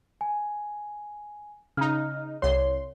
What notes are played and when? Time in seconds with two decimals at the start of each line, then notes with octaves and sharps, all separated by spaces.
0.21 G#5
1.77 C#3 D#4 F6
2.42 C2 C#5 C6